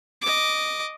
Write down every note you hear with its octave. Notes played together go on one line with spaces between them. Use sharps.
D#5 D6